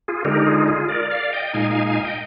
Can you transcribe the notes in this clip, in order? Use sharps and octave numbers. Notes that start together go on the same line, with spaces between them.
F4 G#4
D3 G#3 D#4 G4 A#4
A#4
F4 G#4
F4 G#4
A#4 D5
D5 F5
D#5 G5
A#2 G#3 D#4 F5 G#5
F5 G#5
F5 G#5
D#5 G5